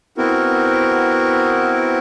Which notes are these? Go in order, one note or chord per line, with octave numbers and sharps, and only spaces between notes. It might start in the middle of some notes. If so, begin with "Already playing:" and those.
B3 C4 E4 F#4 A#4